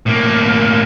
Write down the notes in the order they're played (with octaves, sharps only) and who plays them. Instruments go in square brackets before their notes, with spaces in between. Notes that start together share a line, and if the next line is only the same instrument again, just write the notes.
[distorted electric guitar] A2 A#3